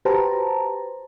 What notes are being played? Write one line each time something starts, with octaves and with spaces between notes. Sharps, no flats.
F#4 G4 B4 C5 A5 A#5